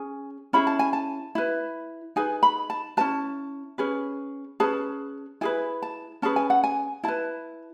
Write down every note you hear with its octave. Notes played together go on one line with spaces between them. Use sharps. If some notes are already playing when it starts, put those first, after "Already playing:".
Already playing: C#4 G#4 G#5
C#4 E4 G#4 B5
A5
G#5
A5
E4 B4
D#4 G#4 B4 G#5
B5
A5
C#4 E4 B4 A5
C#4 G#4 B4
C#4 G#4 B4 A5
E4 G#4 B4 G#5
A5
C#4 G#4 B4 A5
G#5
F#5
G#5
E4 B4 A5